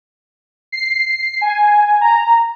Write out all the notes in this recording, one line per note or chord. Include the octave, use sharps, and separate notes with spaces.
C7
G#5
A#5